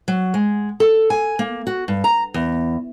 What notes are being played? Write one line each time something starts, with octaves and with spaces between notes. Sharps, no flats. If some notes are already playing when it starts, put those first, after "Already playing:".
F#3
G#3
A4
G#5
A#3
F#4
G2
A#5
E2